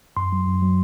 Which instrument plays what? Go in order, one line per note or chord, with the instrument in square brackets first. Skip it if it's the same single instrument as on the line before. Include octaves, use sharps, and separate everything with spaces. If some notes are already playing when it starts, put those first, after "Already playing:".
[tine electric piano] F#2 C6
F#3
F#2
F#3